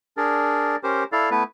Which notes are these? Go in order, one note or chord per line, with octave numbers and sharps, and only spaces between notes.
D4 G#4 A#4 D5
C#4 G4 A#4 C5
E4 A4 D5 F5
A3 B3 E4 B4